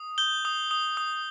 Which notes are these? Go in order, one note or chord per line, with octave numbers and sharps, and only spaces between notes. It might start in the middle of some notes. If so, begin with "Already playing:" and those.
Already playing: D#6
G6 G7
D#6
D#6
D#6